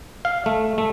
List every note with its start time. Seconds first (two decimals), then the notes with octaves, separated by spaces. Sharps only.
0.25 F5
0.46 A3
0.78 A3